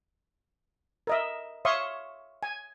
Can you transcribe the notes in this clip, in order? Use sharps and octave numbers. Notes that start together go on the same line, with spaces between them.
A#4 D#5 E5
C#5 E5 F5 C6 C#6 D#6
G#5